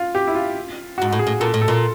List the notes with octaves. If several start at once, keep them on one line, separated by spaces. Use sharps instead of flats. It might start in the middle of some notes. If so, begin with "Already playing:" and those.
Already playing: F4
G4
E4
F4
G#2 F#4
A2
G#4
A2
A#2 A4
A2
A4
A#2